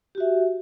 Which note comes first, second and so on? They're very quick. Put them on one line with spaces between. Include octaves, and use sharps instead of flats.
G4 F#4 E5